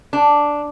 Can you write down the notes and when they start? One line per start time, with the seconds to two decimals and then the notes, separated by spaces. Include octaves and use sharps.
0.13 D4